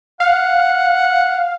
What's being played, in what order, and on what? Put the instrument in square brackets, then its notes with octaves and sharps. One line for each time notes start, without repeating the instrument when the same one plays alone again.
[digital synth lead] F5 [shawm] F#5